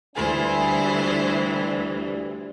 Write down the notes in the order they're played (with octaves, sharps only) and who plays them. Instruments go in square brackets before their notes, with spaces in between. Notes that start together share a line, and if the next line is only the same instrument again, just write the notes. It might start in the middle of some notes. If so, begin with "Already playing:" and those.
[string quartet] D2 E3 [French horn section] G3 D4 [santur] F4 G#5 [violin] B4 C5